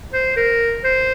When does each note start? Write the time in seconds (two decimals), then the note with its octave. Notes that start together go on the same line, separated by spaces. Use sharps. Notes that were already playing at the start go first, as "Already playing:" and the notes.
0.13 C5
0.37 A#4
0.84 C5